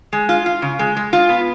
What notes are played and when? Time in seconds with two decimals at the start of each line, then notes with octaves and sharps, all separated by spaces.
0.13 G#3
0.29 F4
0.46 F4
0.62 C#3
0.79 G#3
0.97 G#3
1.13 F4
1.29 B3